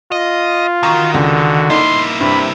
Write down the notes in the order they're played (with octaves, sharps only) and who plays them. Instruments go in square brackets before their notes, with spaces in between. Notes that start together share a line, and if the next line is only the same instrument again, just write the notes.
[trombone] F4 [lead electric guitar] D#5
[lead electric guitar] D#3 [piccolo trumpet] F#4 [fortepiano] A#5 C#6
[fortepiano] C#2 [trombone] D3
[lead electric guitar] A#3 E4 [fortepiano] D#4 [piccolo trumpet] C6
[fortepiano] G2 [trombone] C3 [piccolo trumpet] B5